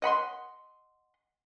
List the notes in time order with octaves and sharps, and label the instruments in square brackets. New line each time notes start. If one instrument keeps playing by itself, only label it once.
[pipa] D#5 F#5 B5 C6